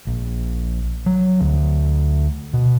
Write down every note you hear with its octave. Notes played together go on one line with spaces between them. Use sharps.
A#1
F#3
D2
B2